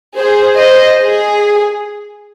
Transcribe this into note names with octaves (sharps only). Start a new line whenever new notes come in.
G#4 C5
C5 D#5
G#4